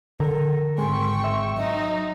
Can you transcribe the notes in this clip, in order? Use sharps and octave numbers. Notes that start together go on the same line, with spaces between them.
D3 A4 A#4
G#1 G#3 G5 C6 C#6
E5
F#3 D#4 D#5